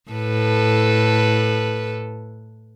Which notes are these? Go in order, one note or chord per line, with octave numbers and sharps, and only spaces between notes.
A2 A4 B4